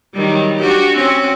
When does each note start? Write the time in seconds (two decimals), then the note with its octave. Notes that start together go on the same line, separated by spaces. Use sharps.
0.14 D#3 F#3 G3
0.59 D4 F#4 G4
0.96 C4 C#4 F#4